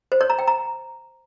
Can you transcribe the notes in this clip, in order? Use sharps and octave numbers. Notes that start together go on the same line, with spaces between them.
C5
C#5
A#5
G5
A#5